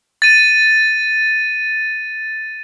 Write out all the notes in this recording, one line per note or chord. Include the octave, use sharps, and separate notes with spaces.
A6 D#7